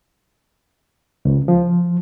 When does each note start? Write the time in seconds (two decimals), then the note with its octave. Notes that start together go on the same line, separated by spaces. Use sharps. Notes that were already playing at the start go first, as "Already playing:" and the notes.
1.25 C#2
1.48 F3